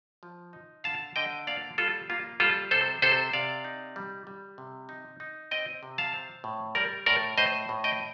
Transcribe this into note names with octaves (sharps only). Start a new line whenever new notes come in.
F3
D#4
D3 F5 A5
D3 D#5 G5
A#3 D5 F5
G3 F4 A4
A#3 F4
G3 F4 A4
C3 A4 C5
C3 A4 C5
C3 D5 F5
D#4
G3
G3
C3
D#4
D#4
C4 D#5 G5
C3
F5 A5
C4
A2
G3 A#4 D5
A2 A#4 D5
A2 C5 D#5
A2
D#5 G5